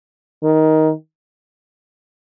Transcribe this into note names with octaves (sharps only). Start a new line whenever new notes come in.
D#3